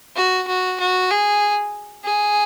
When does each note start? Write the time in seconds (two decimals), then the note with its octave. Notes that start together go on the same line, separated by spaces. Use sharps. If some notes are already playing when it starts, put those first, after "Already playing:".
0.17 F#4
0.48 F#4
0.80 F#4
1.11 G#4
2.05 G#4